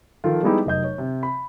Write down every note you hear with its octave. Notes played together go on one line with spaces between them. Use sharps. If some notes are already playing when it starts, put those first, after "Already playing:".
D#3 F3 F4 A4
G3 G#3 B3 D#4 E4 G4
F1 F#3 D#5 G6
C#5
C3
B5